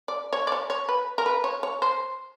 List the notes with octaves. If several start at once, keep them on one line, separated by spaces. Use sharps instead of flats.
D5
C#5
D5
C#5
C#5
B4
A#4
B4
C#5
C#5
C5